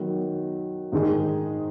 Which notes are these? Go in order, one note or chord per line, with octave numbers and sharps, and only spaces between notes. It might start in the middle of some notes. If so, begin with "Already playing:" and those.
Already playing: D#3 F#3 B3
G#2 D#3 G#3 D#4 G#4